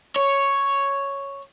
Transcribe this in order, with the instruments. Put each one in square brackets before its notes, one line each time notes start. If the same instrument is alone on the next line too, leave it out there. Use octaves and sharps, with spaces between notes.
[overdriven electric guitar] C#5